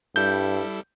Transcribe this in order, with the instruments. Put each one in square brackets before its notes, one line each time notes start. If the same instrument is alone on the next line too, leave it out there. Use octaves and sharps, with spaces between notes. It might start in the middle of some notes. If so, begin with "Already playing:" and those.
[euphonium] G2 [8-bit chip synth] G3 E4 A4 [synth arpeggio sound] G6